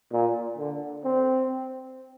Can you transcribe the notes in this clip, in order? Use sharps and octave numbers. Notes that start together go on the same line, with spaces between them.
A#2
D3
C4